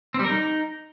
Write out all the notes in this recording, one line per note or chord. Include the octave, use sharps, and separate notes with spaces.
C4
G3
A#4
D#4